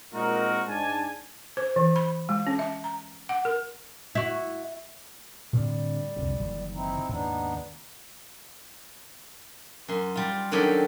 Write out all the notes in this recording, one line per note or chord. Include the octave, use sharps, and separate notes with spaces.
A#2 G#3 C4 D#4 F#4 A#4
G#2 D4 G#5 A5
C5
E3
B5
G#3
C#4
E5
A#5
F#5
A#4
E4 F#4
A2 D3 G3 C4
C2 F2 D3
F#1 D#3 E3
C4 D#4 E4
D#2 G#2 C#3 B3 D4 D#4
F#2 C6
G3 F4
D#3 F#3 C#4 D4 G4 A4